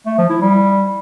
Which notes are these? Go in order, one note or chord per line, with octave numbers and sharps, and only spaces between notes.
A3
F3
E4
G3